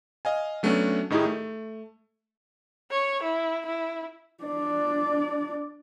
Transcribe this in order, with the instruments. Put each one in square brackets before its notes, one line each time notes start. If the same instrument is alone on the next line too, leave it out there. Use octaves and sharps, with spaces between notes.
[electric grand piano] D#5 F5 G#5
F#3 A3 B3 C#4 D4
A2 D#3 D#4 E4 G4 G#4
A3
[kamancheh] C#5
E4
E4
[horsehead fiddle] D4 D5